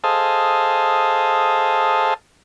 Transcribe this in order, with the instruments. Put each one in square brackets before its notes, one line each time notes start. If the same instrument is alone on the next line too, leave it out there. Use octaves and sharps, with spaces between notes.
[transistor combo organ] G#4 A4 C5 D#5 F5 A5